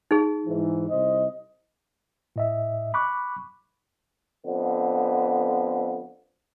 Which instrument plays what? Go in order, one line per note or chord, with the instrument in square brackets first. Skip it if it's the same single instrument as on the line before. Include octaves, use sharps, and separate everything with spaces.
[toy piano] D#4 G#4
[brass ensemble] G#2 E3
C2 C5 D#5
[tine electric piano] A2 D#5 E5
B5 C#6 D6 F#6
[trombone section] F2 D3 B3